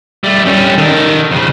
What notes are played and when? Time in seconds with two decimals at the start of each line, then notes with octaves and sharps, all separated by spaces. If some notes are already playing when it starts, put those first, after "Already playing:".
0.24 G3 A3
0.46 G3 C#4
0.78 D#3 A4
1.31 F2 C#3